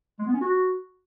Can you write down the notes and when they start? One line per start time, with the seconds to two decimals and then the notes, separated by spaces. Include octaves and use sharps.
0.19 G#3
0.26 B3
0.34 C#4
0.41 F#4